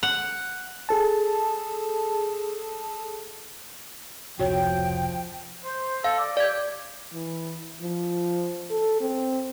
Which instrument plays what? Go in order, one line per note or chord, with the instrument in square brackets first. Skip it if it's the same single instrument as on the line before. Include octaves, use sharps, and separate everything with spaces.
[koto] F#5
[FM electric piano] G#4 A4 A5
[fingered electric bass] F1 C#2 C3 [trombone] F3 [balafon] F#4 C#5 [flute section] G5
[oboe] C5
[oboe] A4 [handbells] F5
[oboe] D5
[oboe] G4 [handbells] D5 G#6
[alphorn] E3
F3
A4
C4